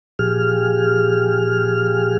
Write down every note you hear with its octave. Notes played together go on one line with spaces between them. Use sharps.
A#2 F3 G4 G#4 F6